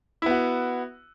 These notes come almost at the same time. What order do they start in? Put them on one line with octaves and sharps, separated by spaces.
E4 B3 F#4